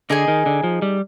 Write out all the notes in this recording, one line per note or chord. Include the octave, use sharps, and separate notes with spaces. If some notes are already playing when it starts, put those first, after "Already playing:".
D3 D#4 G#4 D#5 G#5
D#3
D3
F3
G3